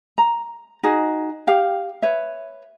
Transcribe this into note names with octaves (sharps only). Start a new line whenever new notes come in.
A#5
D#4 F#4 G#4 D#5
G4 F5 G5
B4 C#5 E5